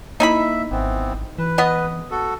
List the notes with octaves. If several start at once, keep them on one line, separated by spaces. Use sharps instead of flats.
A#3 D#4 E4 E5 B5
G#1 E3 B3 C4
E3 B4
B3 D#5
F#4 A4